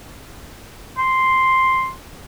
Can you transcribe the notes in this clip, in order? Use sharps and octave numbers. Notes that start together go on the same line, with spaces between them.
C6